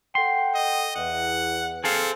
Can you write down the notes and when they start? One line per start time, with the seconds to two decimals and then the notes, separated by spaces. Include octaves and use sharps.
0.15 A4 F#5 G5 C6
0.55 D#5
0.95 E2 F#5
1.84 C4 G#4 A4 F5